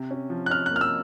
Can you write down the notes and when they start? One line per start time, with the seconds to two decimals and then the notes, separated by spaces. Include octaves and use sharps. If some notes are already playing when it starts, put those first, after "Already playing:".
Already playing: C3
0.11 C#4
0.30 F3
0.46 F#6
0.50 C#4 F6
0.66 F#6
0.71 A#3
0.76 F6
0.81 E6